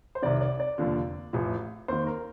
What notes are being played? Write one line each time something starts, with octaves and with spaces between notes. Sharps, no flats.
C5
C2 C3 D#3 D5
D5
D5
F1 D#2 D3 F3
A1 A2 F3
D#2 D#3 C5
A#4